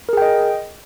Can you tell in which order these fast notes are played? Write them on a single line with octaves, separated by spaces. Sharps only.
A#4 G#4 G5 D#5